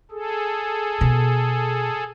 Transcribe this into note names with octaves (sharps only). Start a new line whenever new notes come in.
G#4 A4
B2